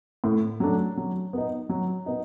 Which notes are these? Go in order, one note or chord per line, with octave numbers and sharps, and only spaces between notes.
A2
F#3 A3 D4
F#3
B3 D#4
F#3
B3 D#4